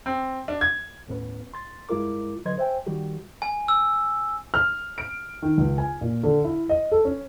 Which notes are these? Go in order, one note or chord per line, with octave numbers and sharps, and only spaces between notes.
C4
D4
G#6
D#2 A2 B3 C#4 B4
C6 A6
G2 G#3 E4 F4 A#4 D6
D3 F#3 B4 D#5 C6 G#6
C5 E5 G5 G#5
D#3 G3 F#4 G4
G#5
E6
F6
D7
D#3
C#2
G#5
A#2
D3
E4
D#5
A4
C#4